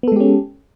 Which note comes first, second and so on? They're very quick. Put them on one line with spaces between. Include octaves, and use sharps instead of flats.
B3 A4 G#3 G4 C#4